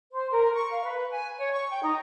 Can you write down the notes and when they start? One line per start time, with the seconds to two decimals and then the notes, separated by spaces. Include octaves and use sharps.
0.11 C5
0.30 A#4
0.53 C#6
0.70 F5
0.84 B4
1.09 G#5
1.36 C#5
1.51 C#6
1.70 G5
1.82 D#4